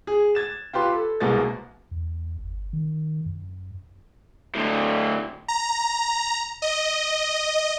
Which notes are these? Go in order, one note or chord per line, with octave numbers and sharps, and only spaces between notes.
G#4
G#6 A6 E7
F4 G4 B4 C6
A4
C2 B2 G#3 A#3 A6
E2
G1
D#3
F#2
A2 D3
A#5
D#5